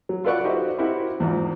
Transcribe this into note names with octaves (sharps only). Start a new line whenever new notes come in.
F#3
F4 A4 B4 D5 F#5 C#6
D#4 F#4 G4 C5 D#5 E5
C4 E4 F#4 G4 A#4 F#5
E2 G#2 F3